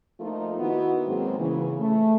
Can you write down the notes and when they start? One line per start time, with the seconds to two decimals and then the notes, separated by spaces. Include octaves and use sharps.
0.20 F3 A3 A#3 D#4 F4
0.59 D#3 B3 D#4 E4 F#4
1.07 G#2 D#3 F#3 G#3 A#3 C4
1.39 C#3 E3
1.80 A3